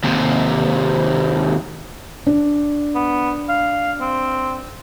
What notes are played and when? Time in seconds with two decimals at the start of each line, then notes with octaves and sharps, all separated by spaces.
0.04 D#2 C3
2.27 D4
2.95 B3
3.49 F5
4.01 C4